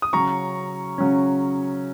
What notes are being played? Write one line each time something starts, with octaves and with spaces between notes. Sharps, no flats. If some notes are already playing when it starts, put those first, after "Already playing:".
D#6
C#3 F#3 C#4 A#5 C#6
C#3 F#3 C#4